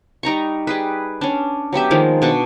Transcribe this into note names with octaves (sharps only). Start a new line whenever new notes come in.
G3 D#4 A#5 C#6
G3 G#4 B4
C#4 D4
F#3 B3 G4 E5
D#3 F3 G#3 A#3
B2 D4 C#6